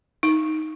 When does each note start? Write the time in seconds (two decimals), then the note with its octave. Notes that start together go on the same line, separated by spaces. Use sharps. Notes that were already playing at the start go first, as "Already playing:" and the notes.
0.23 D#4